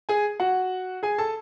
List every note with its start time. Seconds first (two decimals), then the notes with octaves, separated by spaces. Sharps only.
0.09 G#4 G#5
0.40 F#4 F#5
1.03 G#4 G#5
1.18 A4 A5